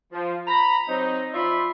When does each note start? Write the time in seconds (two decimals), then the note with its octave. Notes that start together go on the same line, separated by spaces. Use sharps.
0.12 F3
0.48 A#5 B5
0.88 F#3 C4 D#4
1.33 F3 F4 D5 E5 B5 C6